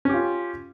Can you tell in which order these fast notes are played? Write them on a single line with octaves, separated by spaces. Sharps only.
C#4 G4 F4